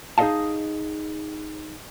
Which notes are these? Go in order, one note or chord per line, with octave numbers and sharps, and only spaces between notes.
D#4 G#4 A4 D#5 F5 A5